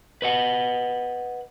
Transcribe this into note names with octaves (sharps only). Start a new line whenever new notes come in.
B4 D#5 F#5